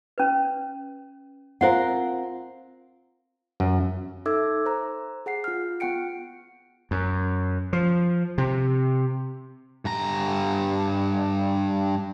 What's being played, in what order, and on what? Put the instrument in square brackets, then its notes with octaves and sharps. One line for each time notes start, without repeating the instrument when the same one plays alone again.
[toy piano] C#4 B4
[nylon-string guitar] C4 F4 A#4 [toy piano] C5 F#5
[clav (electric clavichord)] F#2
[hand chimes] D#4 A4 E5 D6 E6 G#6
C5 A#5
G#4 F#5 C7
F4 F6
B3 F4 F#5 G5 C#7 D7
[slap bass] F#2
F3
C3
[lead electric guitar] G2 A#5